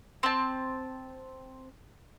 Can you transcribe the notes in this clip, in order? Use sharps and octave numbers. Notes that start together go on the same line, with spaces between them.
C4 A5